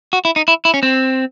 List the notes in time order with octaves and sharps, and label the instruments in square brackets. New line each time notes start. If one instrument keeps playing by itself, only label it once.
[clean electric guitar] F#4
E4
D#4
E4
E4
C#4
C4